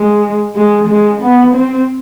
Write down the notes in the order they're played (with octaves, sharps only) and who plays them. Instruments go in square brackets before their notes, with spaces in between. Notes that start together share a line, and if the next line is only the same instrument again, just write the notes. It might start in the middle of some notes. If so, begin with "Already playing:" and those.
Already playing: [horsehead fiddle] G#3
G#3
G#3
B3
C4